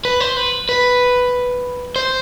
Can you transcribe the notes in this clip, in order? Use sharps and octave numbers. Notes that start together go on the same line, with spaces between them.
B4
C5
B4
B4
C5